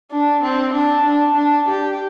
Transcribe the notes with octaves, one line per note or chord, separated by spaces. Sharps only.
D4
C4
D4
D4
D4
G4